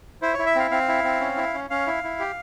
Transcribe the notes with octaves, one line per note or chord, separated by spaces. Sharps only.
E4 C5
E4 C#5
E5
C4 F5
C4 F5
E4
C4
C#4
E4
C#4
C#4 F5
E4
E4
G4